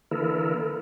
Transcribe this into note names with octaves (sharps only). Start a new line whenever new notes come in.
D3 E3 A#3 E4 A4 A#4